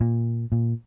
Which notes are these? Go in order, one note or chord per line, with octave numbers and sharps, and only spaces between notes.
A#2
A#2